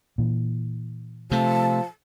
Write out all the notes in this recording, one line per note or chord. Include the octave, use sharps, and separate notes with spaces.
A#2 E3
C3 F3 A3 A5